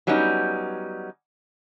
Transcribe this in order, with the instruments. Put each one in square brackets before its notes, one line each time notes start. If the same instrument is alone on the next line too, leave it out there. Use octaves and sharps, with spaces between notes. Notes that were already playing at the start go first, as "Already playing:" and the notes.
[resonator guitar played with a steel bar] F#3 G3 B3 C#4 D#4